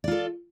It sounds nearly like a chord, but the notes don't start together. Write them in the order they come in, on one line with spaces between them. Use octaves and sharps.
D5 F4 A4